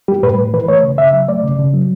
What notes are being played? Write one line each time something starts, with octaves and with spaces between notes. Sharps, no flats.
G3 G4
A2 B4
A2
E3 B4
A3 C#5
C#3
C#3 E5
F#3
A3 D5
C#3
C#3
F#3